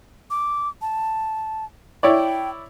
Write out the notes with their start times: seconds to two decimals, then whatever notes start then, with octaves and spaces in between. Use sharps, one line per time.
0.31 D6
0.82 A5
2.03 E4 C#5 D5 G5